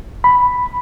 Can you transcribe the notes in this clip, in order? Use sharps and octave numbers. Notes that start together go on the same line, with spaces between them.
B5